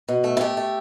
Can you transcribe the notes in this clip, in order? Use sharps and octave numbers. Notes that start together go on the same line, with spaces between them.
B2
A3
E4
A3 G4
A3